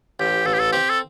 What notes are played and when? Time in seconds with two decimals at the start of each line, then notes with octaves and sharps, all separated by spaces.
0.20 A1 G4
0.46 A1 A4
0.54 G4
0.59 A4
0.72 C4 G4
0.90 A4